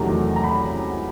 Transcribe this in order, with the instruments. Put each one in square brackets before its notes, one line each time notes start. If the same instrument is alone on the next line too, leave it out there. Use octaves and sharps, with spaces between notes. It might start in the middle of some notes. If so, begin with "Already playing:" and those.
Already playing: [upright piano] E2 C3 D#3 F#3 A3 A#5
A#5
B5